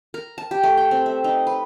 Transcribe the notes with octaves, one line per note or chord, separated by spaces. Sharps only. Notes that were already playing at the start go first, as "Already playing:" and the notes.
A#4
A5
G4
A3
G5
C4
E5
D#4
B4